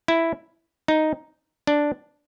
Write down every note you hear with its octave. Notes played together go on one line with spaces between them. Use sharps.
E4
D#4
D4